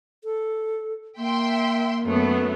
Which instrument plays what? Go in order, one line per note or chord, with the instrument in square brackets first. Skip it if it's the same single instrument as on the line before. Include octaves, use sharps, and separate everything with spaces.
[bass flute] A4
[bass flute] A#3 [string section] E5 G5 C6
[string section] F#2 A3 B3